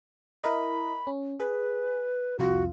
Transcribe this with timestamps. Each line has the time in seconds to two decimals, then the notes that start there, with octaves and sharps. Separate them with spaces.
0.44 E4 A#4 D#5 B5
1.07 C#4
1.40 G#4 B4
2.39 C2 F2 F4 F#4